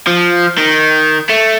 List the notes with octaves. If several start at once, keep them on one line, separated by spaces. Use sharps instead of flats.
F3
D#3
A3